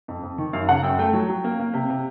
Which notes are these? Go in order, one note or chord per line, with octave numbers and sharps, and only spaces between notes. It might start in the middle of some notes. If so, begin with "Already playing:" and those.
F2
F2
D#3
F#2 F5
C#3 F#5
F#2 G5
A3 G5
F#3
F#3
A#3
A#3
C3
C3